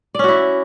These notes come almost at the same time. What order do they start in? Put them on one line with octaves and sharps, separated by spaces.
D5 C#4 F#4 E4